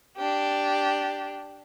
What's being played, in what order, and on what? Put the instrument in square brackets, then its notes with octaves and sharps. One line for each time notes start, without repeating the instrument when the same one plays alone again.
[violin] D4 G4